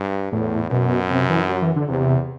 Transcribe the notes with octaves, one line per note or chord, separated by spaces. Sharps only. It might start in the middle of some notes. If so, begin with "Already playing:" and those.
Already playing: G2
E2 A2
F#2 B2
C3
E3
F#3
E3
D3
E2 C3